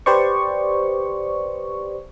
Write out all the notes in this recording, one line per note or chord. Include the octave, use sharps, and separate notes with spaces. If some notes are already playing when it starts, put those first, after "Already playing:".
G4 B4 C5 D5 C#6